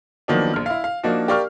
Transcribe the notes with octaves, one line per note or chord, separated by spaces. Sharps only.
D#3 F3 F#3 A#3 B3 D4
A#1 F6
E4 F5
F5
F3 A#3 D4 D#4 F#4
G4 A#4 D5 F5 C#6 F6